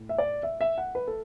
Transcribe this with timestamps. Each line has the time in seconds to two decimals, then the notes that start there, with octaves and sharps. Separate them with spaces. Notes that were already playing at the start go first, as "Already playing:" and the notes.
Already playing: A2
0.09 E5
0.18 D5
0.43 E5
0.61 E5
0.78 F#5
0.95 B4
1.08 A4